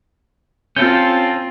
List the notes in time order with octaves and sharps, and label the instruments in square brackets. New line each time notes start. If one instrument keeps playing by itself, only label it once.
[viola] C4 F4 [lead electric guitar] C#4 A4 [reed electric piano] G6